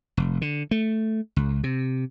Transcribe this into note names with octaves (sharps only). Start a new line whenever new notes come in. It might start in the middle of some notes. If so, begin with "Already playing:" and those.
F1
D3
A3
C#2
C3